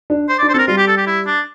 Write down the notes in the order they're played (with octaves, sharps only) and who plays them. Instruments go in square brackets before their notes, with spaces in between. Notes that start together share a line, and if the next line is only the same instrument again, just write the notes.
[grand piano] D4
[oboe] C5
D5
[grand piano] D4
[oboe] C5
[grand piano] C4 [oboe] A4 A#4
[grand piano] G3 [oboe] F4
[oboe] G4
A4
G4
E4
D4